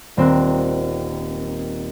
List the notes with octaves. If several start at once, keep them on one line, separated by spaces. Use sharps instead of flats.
D#1 C4 A#4 F#6